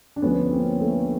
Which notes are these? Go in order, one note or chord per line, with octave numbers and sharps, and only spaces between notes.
D4
D2 D3 F3 B3 C#4
A#3 C4
A3 B3